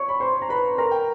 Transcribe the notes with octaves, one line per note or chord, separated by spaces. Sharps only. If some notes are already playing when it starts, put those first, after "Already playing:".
Already playing: C#5 C#6
B5
C5 C6
A#5
B4 B5
A#4 A#5
G5